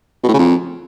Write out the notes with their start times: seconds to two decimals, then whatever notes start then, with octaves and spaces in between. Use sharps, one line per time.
0.23 B2
0.28 A2
0.33 C#3
0.39 F2